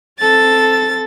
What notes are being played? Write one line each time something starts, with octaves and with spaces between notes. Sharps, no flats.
C4 A4 A6